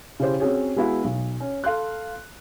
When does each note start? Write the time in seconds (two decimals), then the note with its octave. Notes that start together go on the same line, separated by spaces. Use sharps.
0.20 C#3 E4 G4 C5
0.40 C4 C#4 F#4 G#4 C#5
0.76 G#3 B3 E4 F#4 F5
1.04 B1
1.40 C#4
1.64 A4 F5 C6 F#6